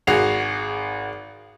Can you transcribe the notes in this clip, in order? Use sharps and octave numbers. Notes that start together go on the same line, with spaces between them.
G#1 F#4 G#4 C7 F7